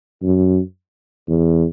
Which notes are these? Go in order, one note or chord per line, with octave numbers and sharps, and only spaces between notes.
F#2
E2